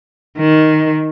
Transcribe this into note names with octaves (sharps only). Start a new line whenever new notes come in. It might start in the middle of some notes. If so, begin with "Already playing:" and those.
D#3